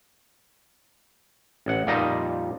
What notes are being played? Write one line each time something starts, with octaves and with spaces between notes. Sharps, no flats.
A1 F#5
F2 A#2 F3 G3 D#4 D#5